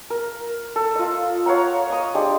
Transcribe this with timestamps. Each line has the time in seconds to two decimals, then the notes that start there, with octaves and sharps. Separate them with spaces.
0.10 A#4
0.76 A4
0.95 F4 D#5
1.46 C#5 F5 F#5 A#5
1.90 D#5 D#6
2.15 G#3 D4 G4